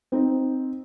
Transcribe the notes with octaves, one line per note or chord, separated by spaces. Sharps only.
C4 D#4